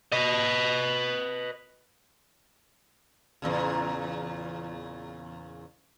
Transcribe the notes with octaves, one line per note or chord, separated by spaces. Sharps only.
B4 D#5
E2 A#2 C#3